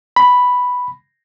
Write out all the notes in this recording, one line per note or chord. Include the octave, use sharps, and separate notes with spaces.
B5